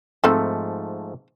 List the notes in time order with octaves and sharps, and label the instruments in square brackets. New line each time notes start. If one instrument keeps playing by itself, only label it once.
[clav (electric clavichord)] G#2 F3 A3 [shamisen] C4 D#4 A4